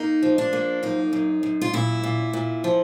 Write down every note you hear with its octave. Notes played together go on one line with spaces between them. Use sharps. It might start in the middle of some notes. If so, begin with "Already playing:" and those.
Already playing: A#3 D#4
F3
D4
A#3
F#2 D#4
F#2
F#2
F4
A#2 E4
A#2
A#2
F3